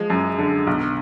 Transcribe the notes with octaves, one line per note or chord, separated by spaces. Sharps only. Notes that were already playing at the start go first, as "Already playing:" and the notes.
Already playing: F3 G#3
F#2
D3
B1